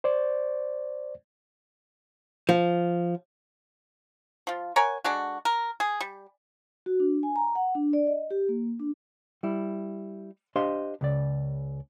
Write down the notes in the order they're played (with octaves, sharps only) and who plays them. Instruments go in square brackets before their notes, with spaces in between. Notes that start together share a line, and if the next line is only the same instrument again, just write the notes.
[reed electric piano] C5 D5
[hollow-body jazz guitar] F3
[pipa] F3 F4
A#4 C#5 F#5 G#5
D3 G#3 D4 F#4
A#4
G#4
G3
[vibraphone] F#4
D4
G#5
A#5
F#5
D4
D5
D#5
G4
A#3
D4
[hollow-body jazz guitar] G3 E4
D4 G4 C5 D#5 F5 C6
C#2 C#3 D5